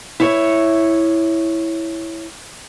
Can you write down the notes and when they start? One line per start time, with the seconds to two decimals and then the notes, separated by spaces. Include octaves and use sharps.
0.20 E4 C#5